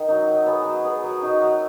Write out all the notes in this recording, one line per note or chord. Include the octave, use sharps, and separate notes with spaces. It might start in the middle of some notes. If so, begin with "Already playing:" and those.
Already playing: D#3
F#3 D#4
F#3
B3 G#4
F#3
B3 G#4
F#3
D#4 F#4
F#3